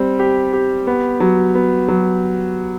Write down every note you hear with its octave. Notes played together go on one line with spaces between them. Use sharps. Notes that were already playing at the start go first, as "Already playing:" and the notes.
Already playing: G3 C4
G4
G4
B3
F#3
B3
F#3